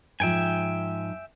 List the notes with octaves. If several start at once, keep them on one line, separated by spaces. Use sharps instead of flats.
G#2 F3 E5 G5 G#5